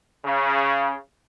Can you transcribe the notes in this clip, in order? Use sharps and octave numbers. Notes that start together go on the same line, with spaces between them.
C#3